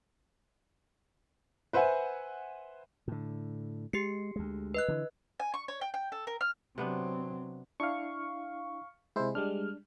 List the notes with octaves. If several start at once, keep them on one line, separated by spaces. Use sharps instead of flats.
B4 C5 E5 F#5 G#5
A2 D3
G#3 G4 C7 C#7
D2 G#3
B4 D#5 F#6
D3 E3
G#5
C#6
C#5
G5
G5
A4
A#4
F6
C3 F#3 B3 C4 D4
D4 E4 F5 C#6
C3 G#3 E4 C5
G3 G#3 D4 F6